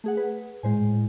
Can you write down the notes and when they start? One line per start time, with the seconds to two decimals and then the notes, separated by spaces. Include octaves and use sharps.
0.04 A3 G#4 F#5
0.17 B4
0.63 A2 G#3 C5 G#5
0.81 A2